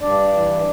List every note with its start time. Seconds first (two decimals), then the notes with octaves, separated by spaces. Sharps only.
0.01 G2 D4 D5
0.33 E3